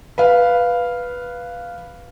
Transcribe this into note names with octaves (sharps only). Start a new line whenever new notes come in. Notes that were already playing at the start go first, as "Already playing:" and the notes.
B4 F5